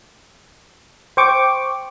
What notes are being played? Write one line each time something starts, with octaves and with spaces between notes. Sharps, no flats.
C5 G5 C#6 D6